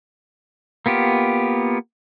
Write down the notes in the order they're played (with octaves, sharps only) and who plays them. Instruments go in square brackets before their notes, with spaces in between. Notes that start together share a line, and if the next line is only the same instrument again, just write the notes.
[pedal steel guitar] A#3 B3 F4 G4